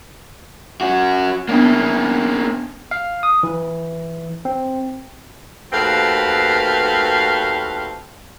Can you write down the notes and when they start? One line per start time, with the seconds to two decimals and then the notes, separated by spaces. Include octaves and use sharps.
0.81 C#4 F#4
1.49 A#3 B3 C#4 D4
2.91 F5
3.23 D#6
3.43 E3
4.45 C4
5.73 D#2 A3 C4 F#4 B4 F5